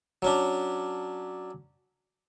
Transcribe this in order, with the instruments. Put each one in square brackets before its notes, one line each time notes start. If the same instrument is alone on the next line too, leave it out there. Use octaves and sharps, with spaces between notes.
[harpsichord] F#3 C#4 D4